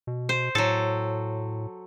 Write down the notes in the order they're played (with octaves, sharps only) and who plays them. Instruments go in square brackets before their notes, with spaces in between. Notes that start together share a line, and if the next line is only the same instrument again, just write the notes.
[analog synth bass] B2
[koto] C5
[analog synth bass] A2 [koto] F#3 A4